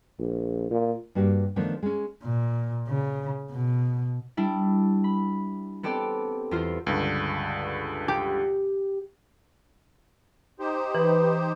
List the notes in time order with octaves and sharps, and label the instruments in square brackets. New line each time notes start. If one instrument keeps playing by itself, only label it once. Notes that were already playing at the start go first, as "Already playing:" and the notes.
[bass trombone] A#1
A#2
[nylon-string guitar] G2 A#3 F#4 G4
D#3 F3 A3 B3 D4
G#3 C#4
[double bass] A#2
C#3
B2
[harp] G3 D4 E4
B5
B3 C4 G4 A4 D5
E2 F4 C5
[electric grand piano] C#2 G2 D3
[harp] G4
[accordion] D#4 G4 C5
[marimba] E3 [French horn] B4